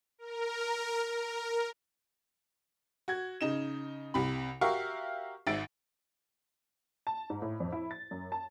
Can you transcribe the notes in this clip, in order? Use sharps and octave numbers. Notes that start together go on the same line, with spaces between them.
A#4
A#4
F#4 G#6
C#3 D#4 E7
C2 C3 B5
F#4 G4 A#4 E5 F5 C#6
G#1 G#2 E5 A6 D7
A5
G#2
A2
F2
E4
A6
F#2
A5